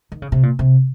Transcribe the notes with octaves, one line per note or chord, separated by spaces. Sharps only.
D#3
C#3
C3
A#2
C3